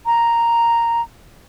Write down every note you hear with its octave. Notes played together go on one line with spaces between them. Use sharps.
A#5